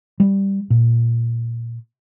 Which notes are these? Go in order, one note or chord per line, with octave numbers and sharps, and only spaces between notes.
G3
A#2